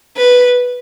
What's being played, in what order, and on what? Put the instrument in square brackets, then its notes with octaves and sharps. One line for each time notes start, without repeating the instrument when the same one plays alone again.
[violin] B4